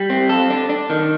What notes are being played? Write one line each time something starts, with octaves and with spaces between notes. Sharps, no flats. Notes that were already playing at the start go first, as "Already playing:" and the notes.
Already playing: G3
C4
A4
D4
D4
D#3